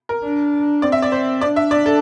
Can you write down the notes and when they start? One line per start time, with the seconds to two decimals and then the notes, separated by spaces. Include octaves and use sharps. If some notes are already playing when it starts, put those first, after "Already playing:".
0.09 A#4
0.24 D4
0.82 C4 D5
0.92 E5
1.02 D5
1.12 C5
1.41 D4 D5
1.56 E5
1.71 D5
1.86 A4